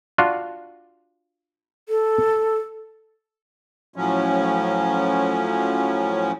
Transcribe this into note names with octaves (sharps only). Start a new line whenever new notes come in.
D4 F4 F#4
A4
A2 F3 F#3 C#4